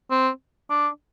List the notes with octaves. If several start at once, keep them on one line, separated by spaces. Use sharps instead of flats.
C4
D4